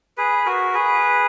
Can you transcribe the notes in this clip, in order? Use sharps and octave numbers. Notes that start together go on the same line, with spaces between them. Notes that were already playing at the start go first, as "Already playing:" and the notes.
G#4 B4
F#4 A#4
G#4 B4